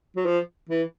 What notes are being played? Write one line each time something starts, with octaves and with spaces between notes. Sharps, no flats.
F#3
F3
E3